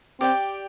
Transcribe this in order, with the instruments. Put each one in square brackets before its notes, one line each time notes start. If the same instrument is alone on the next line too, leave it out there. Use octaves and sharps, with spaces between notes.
[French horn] C4 [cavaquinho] G4 D5 G5